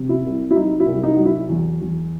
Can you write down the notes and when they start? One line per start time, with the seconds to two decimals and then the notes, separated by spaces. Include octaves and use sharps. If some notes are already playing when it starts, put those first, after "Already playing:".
Already playing: C3 F#3
0.09 E4
0.25 C2
0.51 E4
0.56 F#3 D#4
0.80 E4
0.87 C2
1.03 D#4
1.15 F#3 F#4
1.26 E4
1.49 E2
1.81 E2